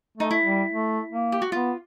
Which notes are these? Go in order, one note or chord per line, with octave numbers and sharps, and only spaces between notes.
A3 D#4
E4
G3
A3
A#3
G4
F#4
B3 F4